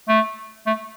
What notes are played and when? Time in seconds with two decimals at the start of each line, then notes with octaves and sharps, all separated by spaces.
0.09 A3
0.66 A3